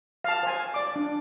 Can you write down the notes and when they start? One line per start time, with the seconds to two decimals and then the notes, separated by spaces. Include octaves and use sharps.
0.24 F5 A5
0.43 C5 G#5
0.74 D5 D6
0.96 D4